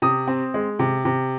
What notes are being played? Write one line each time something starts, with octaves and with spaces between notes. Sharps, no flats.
C3 D#6
C4
G#3
C3
C3